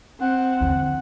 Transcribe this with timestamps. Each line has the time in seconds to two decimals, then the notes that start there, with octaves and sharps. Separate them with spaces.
0.20 C4 F#5
0.61 E2 D3